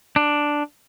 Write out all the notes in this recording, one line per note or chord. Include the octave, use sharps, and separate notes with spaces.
D4